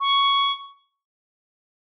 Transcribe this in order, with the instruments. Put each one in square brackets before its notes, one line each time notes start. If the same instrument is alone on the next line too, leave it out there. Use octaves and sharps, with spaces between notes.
[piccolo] C#6